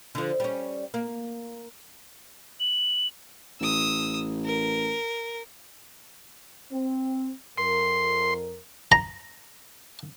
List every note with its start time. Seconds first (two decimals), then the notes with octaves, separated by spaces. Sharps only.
0.15 D3 F3
0.40 G3 C#4
0.94 A#3
2.60 F#7
3.60 A1 D#6 E6
4.45 A#4
6.71 C4
7.58 F2 A#4 C6
8.92 A#5